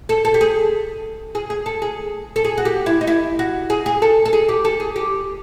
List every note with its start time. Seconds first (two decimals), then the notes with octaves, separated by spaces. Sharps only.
0.09 A4
0.25 A4
0.34 G4
0.41 G#4
1.35 G#4
1.50 G#4
1.66 A4
1.82 G#4
2.36 A4
2.45 G#4
2.58 F#4
2.65 G4
2.86 E4
3.01 D#4
3.07 E4
3.39 F#4
3.70 G#4
3.86 G#4
4.02 A4
4.25 A4
4.33 G#4
4.49 G4
4.65 A4
4.80 G#4
4.96 G4